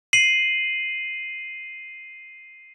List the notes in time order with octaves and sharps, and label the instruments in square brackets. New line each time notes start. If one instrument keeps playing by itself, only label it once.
[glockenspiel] C7 D#7 F#7